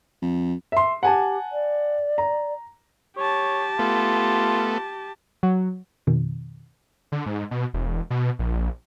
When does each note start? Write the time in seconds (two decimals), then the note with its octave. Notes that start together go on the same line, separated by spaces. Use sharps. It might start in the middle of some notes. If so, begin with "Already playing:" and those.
0.22 F2
0.72 E5 C6
1.03 G4 F#5 G#5 A5
1.52 D5
2.18 A#5
3.17 G4 C#5 A5
3.79 A3 B3 F4
5.43 F#3
6.07 F2 B2 D#3
7.12 D3
7.26 G#2
7.51 B2
7.74 E1
8.10 B2
8.39 A#1